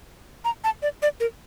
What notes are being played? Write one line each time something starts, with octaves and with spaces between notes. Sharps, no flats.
A#5
A5
D5
D5
A#4